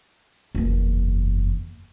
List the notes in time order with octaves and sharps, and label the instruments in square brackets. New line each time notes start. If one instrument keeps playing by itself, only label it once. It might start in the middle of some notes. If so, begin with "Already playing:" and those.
[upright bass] F#1 E2